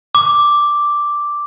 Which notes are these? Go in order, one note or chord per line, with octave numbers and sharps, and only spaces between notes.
D6